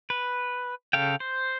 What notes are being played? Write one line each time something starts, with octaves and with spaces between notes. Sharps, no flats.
B4
C#3 A4 F5 G5
C5